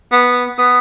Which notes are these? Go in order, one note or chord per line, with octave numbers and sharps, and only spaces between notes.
B3
B3